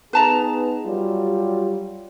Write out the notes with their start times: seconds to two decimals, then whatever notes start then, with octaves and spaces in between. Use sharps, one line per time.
0.13 B3 D#4 G#4 B4 A5 A#5
0.84 F#3 G3 F4